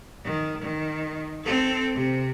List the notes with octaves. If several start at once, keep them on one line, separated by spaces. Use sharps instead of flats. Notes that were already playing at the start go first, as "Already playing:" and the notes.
D#3
D#3
C4 A4
C3